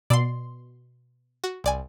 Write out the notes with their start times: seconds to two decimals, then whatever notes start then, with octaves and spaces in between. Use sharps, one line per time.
0.10 B2 D5 C6 E6
1.44 F#4
1.64 C2 D5 G#5